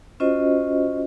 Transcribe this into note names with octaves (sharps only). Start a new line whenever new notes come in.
C#4 F4 F#4 C5 D#5